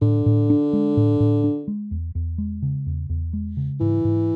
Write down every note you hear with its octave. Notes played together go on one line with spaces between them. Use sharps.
A2 D3
A2
D4
G#3
A2
A2
D4
G#3
E2
E2
G#3
C#3
E2
E2
G#3
C#3
G#2 E3
G#2